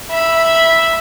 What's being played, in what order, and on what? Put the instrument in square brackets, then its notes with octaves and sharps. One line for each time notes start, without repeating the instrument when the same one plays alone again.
[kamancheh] E5 B5